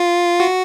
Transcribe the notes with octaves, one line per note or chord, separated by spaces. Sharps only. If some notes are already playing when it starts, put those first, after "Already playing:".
Already playing: F4
F#4